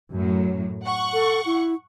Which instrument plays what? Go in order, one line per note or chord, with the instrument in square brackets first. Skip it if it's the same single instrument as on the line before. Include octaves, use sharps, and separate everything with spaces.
[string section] F#2 A2 F#3
F#5 C#6
[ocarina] A4
E4